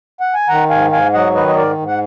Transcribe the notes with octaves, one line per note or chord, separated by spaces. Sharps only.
F#5
G#5
D#3 F#5 A#5
G#2 F5 G#5
G#2 F5 G#5
F#3 D#5 F#5
D#3 B4 D#5
D#5
G#2 A#4 D5
G#2
F#5